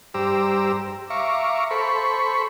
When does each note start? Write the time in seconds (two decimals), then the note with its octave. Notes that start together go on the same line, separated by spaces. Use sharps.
0.14 G2 G4 C5 A#5 D6 E6
1.10 E5 F5 A#5 C#6 D6
1.71 A4 C5 B5 C#6